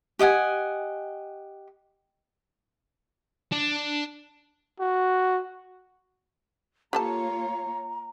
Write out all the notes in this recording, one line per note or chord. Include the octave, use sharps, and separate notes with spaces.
G4 D#5 F#5 G#5
D4
F#4
A#3 F4 G4 A4 C#5 A5 A#5